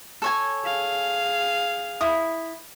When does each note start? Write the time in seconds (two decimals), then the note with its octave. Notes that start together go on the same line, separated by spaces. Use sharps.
0.22 A4 C#5 G#5
0.65 G#4 F5
2.01 E4 D#6